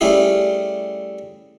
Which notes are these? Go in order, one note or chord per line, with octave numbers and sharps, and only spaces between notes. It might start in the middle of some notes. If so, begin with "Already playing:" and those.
G3 A3 C#4 E4 G4 G#4